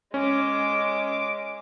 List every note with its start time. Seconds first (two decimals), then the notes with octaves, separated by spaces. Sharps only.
0.14 G#3 C#4 D6